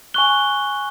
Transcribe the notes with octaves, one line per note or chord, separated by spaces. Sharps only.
G#5 C#6 F#6 G7